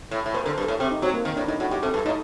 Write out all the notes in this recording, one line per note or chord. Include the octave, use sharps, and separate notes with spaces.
A2
A2
A#2 C5
D3 A#4
C5
G2
A2 A4
C3 G4
D#4
F#3 C4
A#3
D#3
A2 D4
A2 D#4
A2 F#4
A2 G4
C3 A4
G2 A4
A2 D#4